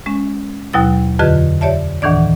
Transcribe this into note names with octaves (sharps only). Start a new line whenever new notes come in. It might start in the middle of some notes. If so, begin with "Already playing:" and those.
G#3 C#4
D#2 B2 F#3 E4 A6
F2 D3 F4 G4 B4 D#5
G4 C#5 D5 E5 A5
D2 A2 D#3 E3 D4 D5